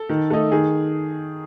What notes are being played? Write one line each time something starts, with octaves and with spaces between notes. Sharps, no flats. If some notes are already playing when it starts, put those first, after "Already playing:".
Already playing: A4
D#3
A3 D#4
D#3 G#4